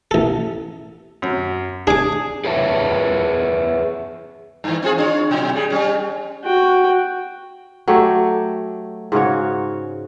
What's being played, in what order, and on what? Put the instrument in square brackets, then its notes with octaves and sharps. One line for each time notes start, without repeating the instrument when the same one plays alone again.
[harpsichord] A1 A4
[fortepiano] F#2
[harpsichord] D4 D6 [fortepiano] G#4
[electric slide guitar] G#4 B4 C#5 E5 A5
[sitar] G2 E3
C4 F4 G#4
D4 F4 C#5
B2 F#3
G3 G#4
G3 C#4
[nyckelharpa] F#4 G5
[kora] F#3 A3 G4 G5
G#2 C#3 F#4 C#5